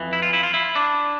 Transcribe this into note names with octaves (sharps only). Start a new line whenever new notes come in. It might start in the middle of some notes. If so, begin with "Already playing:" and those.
Already playing: F2 E3
E4
F4
E4
F4
E4
D4